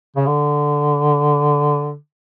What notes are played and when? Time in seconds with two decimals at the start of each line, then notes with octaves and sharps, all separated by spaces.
0.16 C#3
0.26 D3